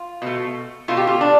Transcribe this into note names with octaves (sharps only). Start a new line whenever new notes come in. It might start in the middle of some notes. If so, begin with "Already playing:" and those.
Already playing: F4
B2 A3
B2 A3 F4
G4
F4
D4